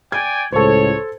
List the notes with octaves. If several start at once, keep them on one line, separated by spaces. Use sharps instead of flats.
D5 G5 G#5 G#6
C#2 A2 A4 C5 C#5